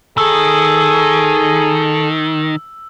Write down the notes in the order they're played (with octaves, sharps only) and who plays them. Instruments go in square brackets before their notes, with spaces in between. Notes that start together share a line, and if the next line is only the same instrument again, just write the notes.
[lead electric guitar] D#3 [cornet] G#4 [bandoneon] A4 [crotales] E6